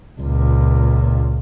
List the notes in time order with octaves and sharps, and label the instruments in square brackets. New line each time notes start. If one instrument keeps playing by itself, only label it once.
[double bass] C#2 A#2